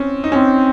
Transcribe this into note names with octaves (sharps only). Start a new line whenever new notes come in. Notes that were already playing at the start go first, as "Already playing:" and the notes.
Already playing: C4 C#4
D#4
C4 C#4